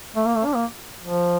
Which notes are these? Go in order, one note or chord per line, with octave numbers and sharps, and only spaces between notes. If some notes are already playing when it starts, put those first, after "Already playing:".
A3
A#3
A3
D4
A#3
F3